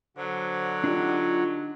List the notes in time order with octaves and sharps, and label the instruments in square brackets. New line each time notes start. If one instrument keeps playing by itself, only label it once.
[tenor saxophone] D3 [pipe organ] F#3 [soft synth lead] C5
[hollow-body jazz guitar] D4 D#4 G4 [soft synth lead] F4